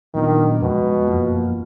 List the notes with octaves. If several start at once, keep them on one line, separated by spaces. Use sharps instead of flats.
A#2 D#3 F#3 B3 D4 F4
F2 B2 F3 G#3
F#2 F3 A#3 F4